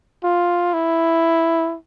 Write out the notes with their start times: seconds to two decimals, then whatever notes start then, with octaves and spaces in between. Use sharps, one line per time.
0.24 F4
0.74 E4